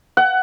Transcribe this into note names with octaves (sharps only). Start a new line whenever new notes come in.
F#5